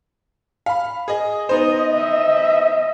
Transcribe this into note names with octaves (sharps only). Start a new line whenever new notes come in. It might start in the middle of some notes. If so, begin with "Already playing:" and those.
F5 B5
G#4 D#5
B3 D#4 C5 D#5
D#5 E5